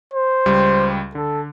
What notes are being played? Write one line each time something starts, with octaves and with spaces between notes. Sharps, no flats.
C5
C#2 G3
D3 A4